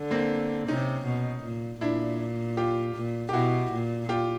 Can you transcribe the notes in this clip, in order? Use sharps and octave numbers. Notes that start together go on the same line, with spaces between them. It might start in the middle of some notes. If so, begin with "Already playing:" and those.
Already playing: D3
A#3 C4
C3 C#4 D#4
B2
A#2
A#2 D4 E4
F4 G4
A#2
G4
B2 E4 F#4
A#2
F4 G4